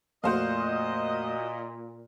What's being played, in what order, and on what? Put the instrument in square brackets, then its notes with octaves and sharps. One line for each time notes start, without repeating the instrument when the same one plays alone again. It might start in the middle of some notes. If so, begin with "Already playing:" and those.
[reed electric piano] F2 A3 A#3 [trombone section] A#2 [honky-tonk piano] F#4 C5 F5 [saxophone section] D#5